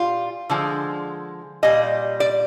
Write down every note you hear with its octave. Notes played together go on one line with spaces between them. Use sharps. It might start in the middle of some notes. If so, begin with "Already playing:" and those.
Already playing: A#2 G3 F4
D3 F3 G#3
A#2 G3 D#5
D5